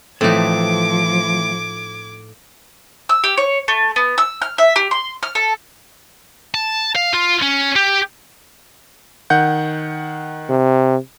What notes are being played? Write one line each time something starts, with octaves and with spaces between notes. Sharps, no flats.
A2 E3 F3 A3 C4 D#4 D6 G#6
E6
G4
C#5
A3
B3
E6
F6
E5
G4
C6
F6
A4
A5
F5
F4
C#4
G4
D#3 F#5 G6
C3